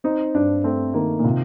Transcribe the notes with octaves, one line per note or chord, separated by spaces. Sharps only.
C4 D#4
G2 D4
A3 C4
D#3 A#3
A#2
C3 F4